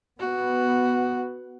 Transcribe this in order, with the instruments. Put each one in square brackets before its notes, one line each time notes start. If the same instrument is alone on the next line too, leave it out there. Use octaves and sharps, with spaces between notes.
[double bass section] B3 [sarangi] F#4